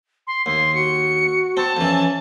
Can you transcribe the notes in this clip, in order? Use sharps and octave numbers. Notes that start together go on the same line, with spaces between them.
C6
D#2 C6
F#4 C#7
C4 A5
F2 E3 C#4